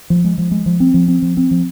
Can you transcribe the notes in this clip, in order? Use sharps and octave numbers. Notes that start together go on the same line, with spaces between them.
F3
G#3
F3
G#3
F3
C4
F3
C4
F3
C4
F3